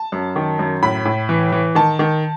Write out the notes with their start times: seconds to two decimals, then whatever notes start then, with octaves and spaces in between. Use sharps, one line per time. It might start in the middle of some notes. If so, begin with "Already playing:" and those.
Already playing: A5
0.12 F#2
0.36 D#3
0.59 F#2
0.83 A2 B5
1.05 A2
1.29 E3
1.52 E3
1.75 D#3 A5
1.99 D#3